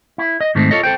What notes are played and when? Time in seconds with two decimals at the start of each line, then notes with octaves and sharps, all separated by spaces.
0.18 E4
0.41 D#5
0.55 G#2 D#3 A3 C4
0.71 F4 A4 C#5 D#5
0.83 A4 C5 G5